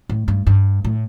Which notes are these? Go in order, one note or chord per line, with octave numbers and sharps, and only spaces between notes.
A2
G2
G2
A2